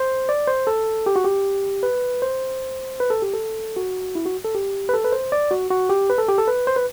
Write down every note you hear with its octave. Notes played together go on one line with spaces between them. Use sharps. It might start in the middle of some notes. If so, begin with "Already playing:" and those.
Already playing: C5
D5
C5
A4
G4
F#4
G4
B4
C5
B4
A4
G4
A4
F#4
E4
F#4
A4
G4
B4
A4
B4
C5
D5
F#4
F#4
G4
B4
A4
G4
A4
B4
C5
B4